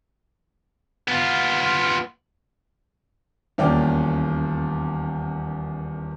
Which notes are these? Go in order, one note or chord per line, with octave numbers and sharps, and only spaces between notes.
B3 F4
D#1 E2 A#3 C#4 D5 G5